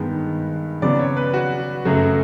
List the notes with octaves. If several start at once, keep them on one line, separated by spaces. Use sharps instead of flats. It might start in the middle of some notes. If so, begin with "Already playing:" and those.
Already playing: G2 D#3 G#3 B3
C#3 F#3 B3 D5
C#5
B4
F#4
F#2 C#3 F#3 A3